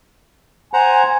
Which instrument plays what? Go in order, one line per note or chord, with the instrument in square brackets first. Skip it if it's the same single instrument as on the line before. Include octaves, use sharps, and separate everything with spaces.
[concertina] C5 F#5 A#5 [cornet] G#5